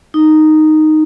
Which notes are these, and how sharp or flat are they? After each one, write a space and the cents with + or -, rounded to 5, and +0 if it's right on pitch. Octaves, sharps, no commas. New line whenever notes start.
D#4 -5